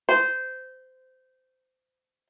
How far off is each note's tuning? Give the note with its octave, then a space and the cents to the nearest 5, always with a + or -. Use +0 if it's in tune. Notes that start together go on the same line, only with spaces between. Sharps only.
C5 -20